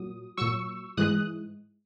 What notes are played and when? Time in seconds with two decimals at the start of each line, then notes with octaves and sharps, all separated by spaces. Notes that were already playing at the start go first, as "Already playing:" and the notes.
Already playing: A#2 F#3 D#6
0.37 A#2 F#3 C#6 E6
0.97 G#2 E3 G#3 D#6 F#6